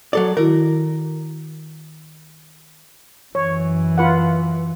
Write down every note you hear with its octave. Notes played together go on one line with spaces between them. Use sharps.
F#3 A4 D5
D#3 E4 F#4 A#4
F#2 E3 C#5
F4 B4 F#5